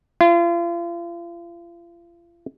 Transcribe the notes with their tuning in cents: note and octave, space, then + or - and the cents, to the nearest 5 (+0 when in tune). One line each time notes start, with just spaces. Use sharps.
F4 -40